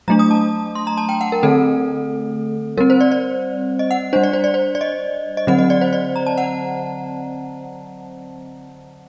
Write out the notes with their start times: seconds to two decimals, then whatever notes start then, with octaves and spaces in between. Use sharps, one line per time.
0.08 F#3 A3 D4 A#5
0.19 D#6
0.31 A5
0.75 C6
0.87 A#5
0.97 A5
1.09 G5
1.21 F#5
1.32 A#4
1.43 D3 A3 C4 A4
2.78 G3 C4 A#4
2.90 C5
3.01 D5
3.12 D5
3.79 D#5
3.91 F#5
4.13 G3 D4 C5
4.23 D5
4.33 C5
4.44 D5
4.54 C5
4.75 D5
4.81 D#5
5.37 D#5
5.47 D3 F#3 C4 F#5
5.59 D#5
5.70 D5
5.81 C5
5.93 D5
6.16 A#5
6.27 A5
6.38 F#5